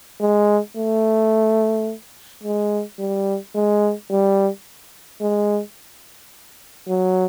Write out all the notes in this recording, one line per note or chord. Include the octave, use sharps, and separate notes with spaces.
G#3
A3
G#3
G3
G#3
G3
G#3
F#3